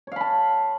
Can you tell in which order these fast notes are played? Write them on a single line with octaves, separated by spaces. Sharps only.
C#5 F5 B5 A5